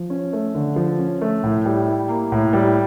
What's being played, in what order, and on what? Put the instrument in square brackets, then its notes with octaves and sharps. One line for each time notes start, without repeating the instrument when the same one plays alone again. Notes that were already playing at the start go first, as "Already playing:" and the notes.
Already playing: [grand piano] F3
C#4
A3
D3
F3
C#4
A3
A2
G3
E4
A#3
A2
G3